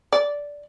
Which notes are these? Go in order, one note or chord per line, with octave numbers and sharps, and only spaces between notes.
D5